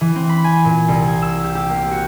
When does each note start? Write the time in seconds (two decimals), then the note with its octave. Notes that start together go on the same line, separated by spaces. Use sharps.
0.01 E3
0.16 C4
0.29 B5
0.44 G#5
0.65 A#2
0.88 C2
1.07 G#6
1.22 E6
1.44 G4
1.55 G4
1.69 A#3
1.91 F#4